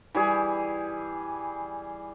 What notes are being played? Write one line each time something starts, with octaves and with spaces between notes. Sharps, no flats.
E3 G3 G#4